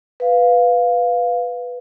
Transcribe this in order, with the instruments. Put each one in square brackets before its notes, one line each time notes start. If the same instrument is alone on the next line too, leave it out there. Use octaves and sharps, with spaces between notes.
[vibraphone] B4 F5